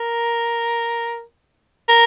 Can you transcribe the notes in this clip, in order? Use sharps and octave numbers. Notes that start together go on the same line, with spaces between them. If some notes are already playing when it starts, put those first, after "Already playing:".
Already playing: A#4
A#4